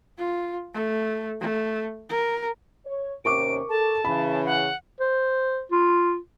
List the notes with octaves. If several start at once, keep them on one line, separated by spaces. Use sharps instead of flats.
F4
A3
A3
A#4
C#5
D#2 C3 C#4 A#4 C#6 D6 D7
A4 A5
C#3 E3 B5
F#5
C5
F4